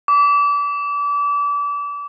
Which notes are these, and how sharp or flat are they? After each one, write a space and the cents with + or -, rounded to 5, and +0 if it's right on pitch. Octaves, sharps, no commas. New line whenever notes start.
D6 -30